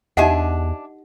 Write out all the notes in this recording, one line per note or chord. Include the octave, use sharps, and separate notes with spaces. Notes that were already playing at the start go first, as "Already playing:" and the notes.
E2 D4 D#4 G4 D#5 E5 F#5 G#5